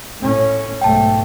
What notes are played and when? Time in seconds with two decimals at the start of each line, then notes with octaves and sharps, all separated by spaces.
0.21 A2 C#4
0.82 B1 G#2 A3 G5 A5